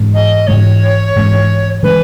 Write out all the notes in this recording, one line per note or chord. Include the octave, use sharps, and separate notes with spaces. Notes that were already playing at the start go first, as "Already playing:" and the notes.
Already playing: G#2 E3 G#3 C#4
D#5
G#2 E3 G#3 C#4 C#5
G#2 E3 G#3 C#4
E3 G#3 C#4 B4